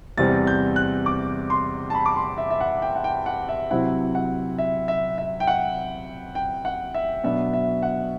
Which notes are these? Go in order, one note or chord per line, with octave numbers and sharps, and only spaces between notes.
E2 C3 G3 C4 A6
G6
F#6
D6
C6
A5
B5
D6
C6
E5
E5
F#5
G5
F#5
G5
F#5
E5
C3 F#3 C4 E4 F#5
F#5
E5
E5
E5
G5
F#5
G5
F#5
E5
B2 F#3 B3 D4 E5
E5
F#5